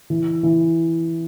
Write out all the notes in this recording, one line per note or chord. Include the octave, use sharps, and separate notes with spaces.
E3
E3